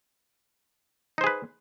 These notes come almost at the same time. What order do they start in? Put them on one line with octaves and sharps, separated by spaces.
D#4 C5 G#4 B4